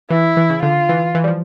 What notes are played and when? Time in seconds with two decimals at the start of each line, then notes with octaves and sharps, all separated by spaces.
0.10 E3 E4
0.37 E3
0.50 C#3
0.63 D3 F4
0.89 E3
1.15 E3
1.24 G3
1.28 F3